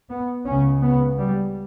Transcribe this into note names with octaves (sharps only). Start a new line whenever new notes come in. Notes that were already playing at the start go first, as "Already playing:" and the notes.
B3
C#2 C#3 C#4
B3
G3